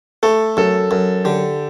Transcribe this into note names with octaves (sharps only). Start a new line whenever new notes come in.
A3 A4
F#2 A4
F#2
D3 G4